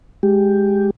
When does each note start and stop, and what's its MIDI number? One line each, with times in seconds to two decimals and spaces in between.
0.23 0.90 56
0.23 0.90 67